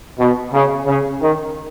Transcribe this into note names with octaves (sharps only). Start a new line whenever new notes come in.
B2
C#3
C#3
D#3